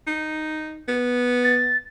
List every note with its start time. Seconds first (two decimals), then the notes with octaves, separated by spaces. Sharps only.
0.07 D#4
0.88 B3
1.44 A6